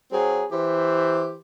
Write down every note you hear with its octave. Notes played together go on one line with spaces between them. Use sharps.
F#3 C4 G#4
E3 G4 C5